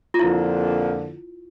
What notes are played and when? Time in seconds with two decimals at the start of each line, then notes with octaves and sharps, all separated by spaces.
0.14 F4
0.19 F2 D3 F3 A#3 D4 E4